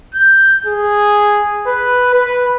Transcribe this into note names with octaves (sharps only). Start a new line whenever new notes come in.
G6
G#4
B4
B4